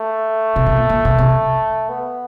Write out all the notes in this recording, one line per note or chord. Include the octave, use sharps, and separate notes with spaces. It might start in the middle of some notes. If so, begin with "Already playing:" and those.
Already playing: A3
C3
B2
A#2
A#2
B2
C3
B3